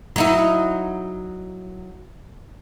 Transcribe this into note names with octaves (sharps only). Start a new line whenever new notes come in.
F#3 D#4 E4